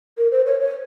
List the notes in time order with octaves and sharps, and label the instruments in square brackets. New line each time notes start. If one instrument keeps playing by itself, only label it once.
[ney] A#4
C5
C#5
C#5